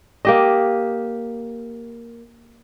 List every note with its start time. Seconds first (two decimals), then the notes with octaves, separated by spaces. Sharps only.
0.25 A#3 G4 D#5